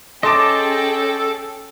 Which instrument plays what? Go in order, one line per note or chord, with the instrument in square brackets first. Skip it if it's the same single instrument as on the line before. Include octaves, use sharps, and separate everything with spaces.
[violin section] C#4 G#4 G5 [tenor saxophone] A4 [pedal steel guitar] D#5 A5 [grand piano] C6 D6